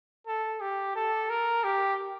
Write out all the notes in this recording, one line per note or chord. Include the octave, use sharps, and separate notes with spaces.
A4
G4
A4
A#4
G4